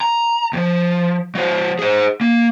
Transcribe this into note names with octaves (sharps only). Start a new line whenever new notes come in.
A#5
D#2 F3
F#3 C5
G#4 C5
A#3